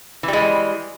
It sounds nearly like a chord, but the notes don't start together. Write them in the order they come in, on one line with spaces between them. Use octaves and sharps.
E3 G3 G#3